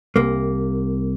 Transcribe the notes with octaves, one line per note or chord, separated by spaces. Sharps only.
C2 A#3